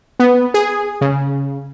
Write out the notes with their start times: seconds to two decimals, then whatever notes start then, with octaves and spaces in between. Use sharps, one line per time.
0.19 B3
0.54 G#4
1.01 C#3